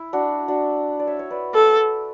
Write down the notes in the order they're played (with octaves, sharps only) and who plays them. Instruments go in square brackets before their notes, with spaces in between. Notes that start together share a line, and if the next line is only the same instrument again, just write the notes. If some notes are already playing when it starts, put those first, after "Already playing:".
Already playing: [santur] E4
D4 F#4
D4 F#4
D5
C#5 E5
C#5
B4 D5
[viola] A4